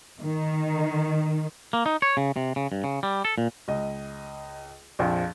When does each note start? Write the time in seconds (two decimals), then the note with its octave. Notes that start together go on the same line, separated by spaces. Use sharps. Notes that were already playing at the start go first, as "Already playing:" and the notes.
0.20 D#3
1.73 A#3
1.86 D#4
2.02 C#5
2.17 C#3
2.36 C3
2.56 C#3
2.72 G2
2.84 C#3
3.03 G3
3.25 A4
3.38 A#2
3.68 C#2 D#5
4.99 A#1 F2 F3